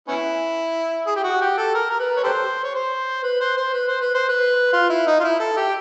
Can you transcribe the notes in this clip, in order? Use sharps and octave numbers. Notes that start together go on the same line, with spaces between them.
B3 C#4 E4
G#4
G4
F#4
G4
A4
A#4
A#4
B4
C#5
G4 A4 C5
C#5
C5
B4
C5
C5
B4
C5
B4
C5
B4
F4
E4
D#4
F4
E4
A4
G4